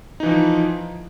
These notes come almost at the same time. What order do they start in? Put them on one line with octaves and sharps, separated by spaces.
D#4 E3 F3